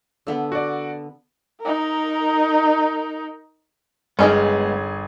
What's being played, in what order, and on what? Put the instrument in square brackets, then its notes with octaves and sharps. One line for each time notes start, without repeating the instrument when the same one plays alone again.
[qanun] D3 B3
[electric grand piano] F#4 D5
[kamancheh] D#4 A#4
[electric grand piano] G1 G#4 [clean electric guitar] G#3 B3 [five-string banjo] C#4 D#4 A#4